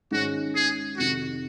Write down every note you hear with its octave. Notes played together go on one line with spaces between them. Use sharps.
G#2 D#3 G#3 C#4 F#4
G#4
F2 C3 D#3 F#4